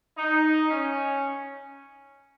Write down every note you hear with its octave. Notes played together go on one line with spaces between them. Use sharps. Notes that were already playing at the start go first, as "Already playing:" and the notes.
D#4
C#4